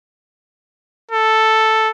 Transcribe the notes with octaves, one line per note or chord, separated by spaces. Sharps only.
A4